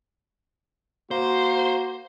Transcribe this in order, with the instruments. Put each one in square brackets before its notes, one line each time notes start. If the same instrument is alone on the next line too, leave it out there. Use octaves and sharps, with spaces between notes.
[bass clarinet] A#3 [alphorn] F#4 [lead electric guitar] C5